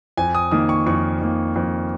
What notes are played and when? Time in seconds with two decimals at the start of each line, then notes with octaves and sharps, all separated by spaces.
0.17 F2 G#5
0.35 D#6
0.51 D#3 A#3 D#6
0.69 C#6
0.86 F2 C#6
1.21 D#3 A#3
1.56 F2